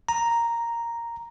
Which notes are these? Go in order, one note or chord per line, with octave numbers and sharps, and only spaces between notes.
A#5